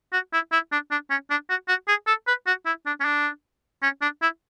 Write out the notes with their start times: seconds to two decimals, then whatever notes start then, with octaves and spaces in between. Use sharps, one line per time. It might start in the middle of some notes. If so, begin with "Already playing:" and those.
0.13 F#4
0.33 E4
0.52 E4
0.72 D4
0.91 D4
1.10 C#4
1.30 D4
1.50 F#4
1.68 F#4
1.88 G#4
2.07 A4
2.27 B4
2.47 F#4
2.66 E4
2.86 D4
3.00 C#4
3.05 D4
3.83 C#4
4.02 D4
4.22 E4